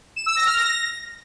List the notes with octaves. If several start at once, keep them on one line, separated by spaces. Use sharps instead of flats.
E7
E6
A#6
F6
A#6